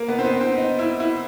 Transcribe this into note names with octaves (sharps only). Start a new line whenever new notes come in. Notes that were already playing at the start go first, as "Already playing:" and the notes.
Already playing: A#3
B3
C4
B3
C4
D#4
E4
E4